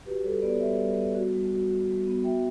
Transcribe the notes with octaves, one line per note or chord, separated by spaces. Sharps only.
F#4 G4 B4
G3 A4 C#5
B3 B4 D5
G3 C#5 E5
G3
B3
F#4
G3
F#4
F#4
G3
B3
F#4 E5 G5